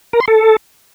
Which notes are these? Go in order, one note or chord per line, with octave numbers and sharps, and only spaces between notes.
A#4
C6
A4